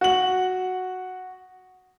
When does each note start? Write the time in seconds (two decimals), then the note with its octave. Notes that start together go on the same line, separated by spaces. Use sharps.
0.01 F#4 F#7